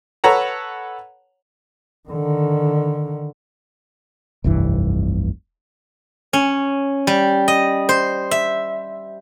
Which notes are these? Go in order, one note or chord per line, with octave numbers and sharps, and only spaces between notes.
A4 B4 C#5 F#5 A#5
D3 D#3
F1 C2 G2 E3
C#4
G3
D#5
C5
E5